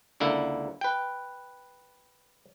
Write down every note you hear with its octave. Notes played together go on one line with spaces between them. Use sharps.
C#2 D3 A#3 E4
B4 G5